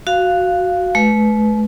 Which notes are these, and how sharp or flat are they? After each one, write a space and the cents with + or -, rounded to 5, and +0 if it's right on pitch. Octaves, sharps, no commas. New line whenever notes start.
F#4 +0 F5 -5
A3 -45 B4 +0